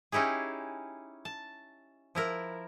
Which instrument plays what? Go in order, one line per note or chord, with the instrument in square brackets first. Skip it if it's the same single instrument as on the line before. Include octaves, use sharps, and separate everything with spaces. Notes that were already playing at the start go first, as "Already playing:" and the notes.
[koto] C#4 D#4 E4 G4 G#4
A5
F3 E4 A#4